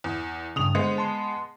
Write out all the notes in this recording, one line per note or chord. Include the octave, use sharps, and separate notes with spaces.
E2
G2 C#3 D#6 F7
D3 G#3 B3 C5
A5 C6